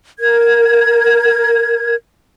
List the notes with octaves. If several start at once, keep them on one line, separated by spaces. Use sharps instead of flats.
A#4 G#6